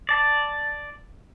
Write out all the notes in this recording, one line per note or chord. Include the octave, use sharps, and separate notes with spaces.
D5 A5